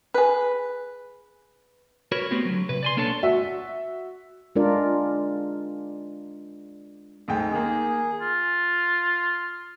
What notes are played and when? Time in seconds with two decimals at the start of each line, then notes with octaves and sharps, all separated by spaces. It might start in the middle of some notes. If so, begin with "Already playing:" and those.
0.14 G#4 B4
2.12 F#4 A#4 B4 C#5
2.31 A3 B3 C4 F#4 G4
2.45 D3 F#3
2.69 C3 B4
2.83 D5 G#5 C6
2.96 B1 A#3 D4 A4 C#5 A5
3.23 F#4 E5
4.56 G#3 D4 F4 A#4 D5
7.28 D2 G#2 G5
7.51 D#3 A#3 G#4
8.21 F4